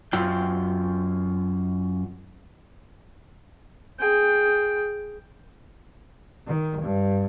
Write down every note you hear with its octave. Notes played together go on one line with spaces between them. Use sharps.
F#2 F4 G5
G#4 G5
D#3
G2